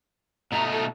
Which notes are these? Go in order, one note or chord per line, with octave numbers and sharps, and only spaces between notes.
B2 A3 D#4 A#5
A4